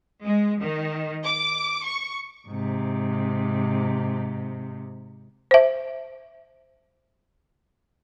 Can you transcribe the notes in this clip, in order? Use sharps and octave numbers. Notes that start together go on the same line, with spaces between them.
G#3
D#3
D6
C#6
G#2 C3
C5 E5